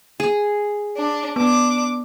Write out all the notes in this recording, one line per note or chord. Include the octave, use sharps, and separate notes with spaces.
G#4
D4
B3 D4 D6